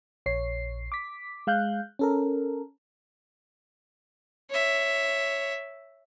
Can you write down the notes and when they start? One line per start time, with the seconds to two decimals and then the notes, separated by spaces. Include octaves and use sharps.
0.26 A#1 C#5 C7
0.92 D6 B6
1.47 G#3 F5 F#6 G6
1.99 C#4 A4 A#4
4.50 C#5 E5